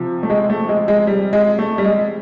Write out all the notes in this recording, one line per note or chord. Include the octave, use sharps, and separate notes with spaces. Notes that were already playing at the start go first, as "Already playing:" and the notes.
Already playing: C3 F3
A3
G#3
A3
G#3
G#3
G3
G#3
A3
G3
G#3